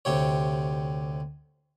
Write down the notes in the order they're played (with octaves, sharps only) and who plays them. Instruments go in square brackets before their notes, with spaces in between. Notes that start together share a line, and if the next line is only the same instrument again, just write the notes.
[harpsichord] D2 C3 G4 C#5